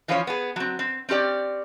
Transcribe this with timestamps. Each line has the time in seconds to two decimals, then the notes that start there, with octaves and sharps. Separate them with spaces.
0.08 E3 F3 C#4 F4 C5 C#5
0.27 B3 G#4
0.56 F#3 C4
0.79 C4
1.09 C4 C#4 G4 D5